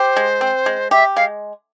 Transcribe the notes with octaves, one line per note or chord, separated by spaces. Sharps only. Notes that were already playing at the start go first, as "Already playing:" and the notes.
Already playing: G4 C5
G#3
C4
G#3
G4 E5
G#3 F5